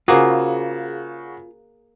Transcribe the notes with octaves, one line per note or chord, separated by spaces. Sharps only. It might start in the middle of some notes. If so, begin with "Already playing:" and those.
C#3 A#3 F4 F#4 G#4 C5